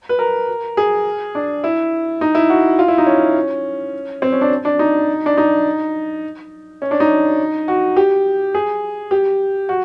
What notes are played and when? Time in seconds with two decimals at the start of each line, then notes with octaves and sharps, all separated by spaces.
0.09 B4
0.19 A#4
0.77 G#4
1.35 D4
1.64 E4
2.21 D#4
2.35 E4
2.50 F#4
2.79 F4
2.88 E4
2.98 D#4
3.06 C#4
4.22 C4
4.32 C#4
4.41 D4
4.65 D4
4.79 D#4
5.26 D4
5.37 D#4
6.82 C#4
6.91 D4
7.00 D#4
7.68 F#4
7.96 G4
8.54 G#4
9.11 G4
9.69 F#4